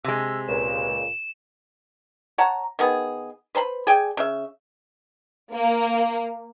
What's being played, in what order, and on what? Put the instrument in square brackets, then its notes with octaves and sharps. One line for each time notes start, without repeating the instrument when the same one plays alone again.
[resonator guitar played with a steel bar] C3 G#3 [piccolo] E6
[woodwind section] C#2 A#2 [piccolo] E7
[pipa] C#5 F#5 A5 A#5
D#3 B3 G#4
B4 C5 A5 B5
G#4 D5 G5 G#5
C#3 E5
[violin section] A#3